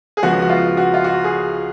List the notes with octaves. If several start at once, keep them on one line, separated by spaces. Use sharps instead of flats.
G#4
C#2 C#3 F3 B3 F#4
F#4
F4
F#4
F4
F#4
G#4